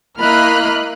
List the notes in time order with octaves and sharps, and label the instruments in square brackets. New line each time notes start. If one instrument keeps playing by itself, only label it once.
[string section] A#3 E4 D#5 B5 F6 F#6